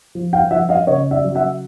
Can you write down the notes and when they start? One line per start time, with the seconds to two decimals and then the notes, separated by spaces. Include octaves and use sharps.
0.15 F3
0.33 F5 G5
0.51 F3 E5 F#5
0.69 D#5 F5
0.87 C#3 C#5 D#5
1.11 D5 E5
1.24 F#3
1.35 E5 F#5